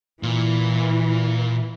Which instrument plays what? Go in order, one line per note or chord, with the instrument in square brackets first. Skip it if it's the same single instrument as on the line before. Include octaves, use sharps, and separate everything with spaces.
[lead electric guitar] A#2 [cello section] E3